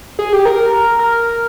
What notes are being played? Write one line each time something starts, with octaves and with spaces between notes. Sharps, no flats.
G#4
G4
A#4
A#4